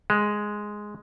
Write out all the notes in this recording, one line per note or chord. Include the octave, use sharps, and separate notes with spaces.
G#3